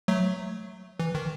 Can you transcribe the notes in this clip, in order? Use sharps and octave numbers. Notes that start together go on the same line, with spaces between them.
F#3 A3
E3
D#3